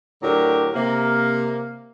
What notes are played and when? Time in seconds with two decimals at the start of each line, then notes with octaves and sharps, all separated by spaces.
0.22 A2 D3 F#3 G4 A#4
0.74 C3 A#3